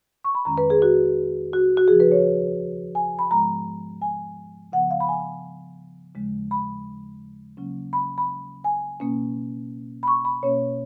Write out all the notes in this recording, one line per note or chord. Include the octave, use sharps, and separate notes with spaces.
C#6
B5
F2 D#3 G#3 C#4 A#5
B4
G#4
F#4
F#4
F#4
D#2 C#3 F3 G#4
B4
C#5
G#5
B5
G#2 F3 G#3 B3 A#5
G#5
C#3 F3 B3 F#5
F5
B5
G#5
D#2 C#3 F3 G#3
B5
C#3 F#3 A#3 C#4
B5
B5
G#5
B2 A#3 C#4
B5
C#6
B5
B2 A#3 C#4 C#5